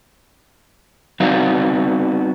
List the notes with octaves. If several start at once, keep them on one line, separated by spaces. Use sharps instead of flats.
G3 B3 C4 D#4 F#4 F5